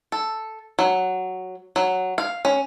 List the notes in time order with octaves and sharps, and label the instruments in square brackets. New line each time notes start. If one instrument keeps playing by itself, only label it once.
[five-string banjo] A4
F#3
F#3
F5
C#4